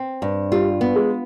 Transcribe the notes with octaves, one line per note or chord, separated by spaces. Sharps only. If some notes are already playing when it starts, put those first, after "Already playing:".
Already playing: C4
G2
G3 F4
B3
G#3